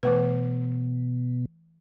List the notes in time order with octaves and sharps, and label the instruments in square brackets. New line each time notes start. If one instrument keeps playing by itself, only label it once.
[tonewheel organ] B2 [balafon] E3 A3 B4